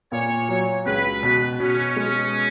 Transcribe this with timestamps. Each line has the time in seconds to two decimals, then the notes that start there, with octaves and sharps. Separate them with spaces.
0.12 A#2 C#5
0.49 F#3
0.86 C#2 B4
1.23 B2
1.60 B2 C#4
1.96 G#3